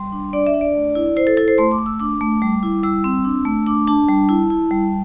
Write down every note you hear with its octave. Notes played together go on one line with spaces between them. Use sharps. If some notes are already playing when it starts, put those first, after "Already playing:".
Already playing: G3 C6
D4
D4 D5
E5
D4
D5
A3
E4
E4 C5
A4
E4 A4
C5
A3 C6
D6
A3
E6
D4 D6
A3
G3
E4
G3 E6
C4
D4
A3
D4 D6
D4 A5
G3
E4
E4
G3